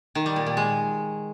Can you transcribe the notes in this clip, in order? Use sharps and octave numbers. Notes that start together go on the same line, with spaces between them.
D#3
G3
A#2
A#2
G#3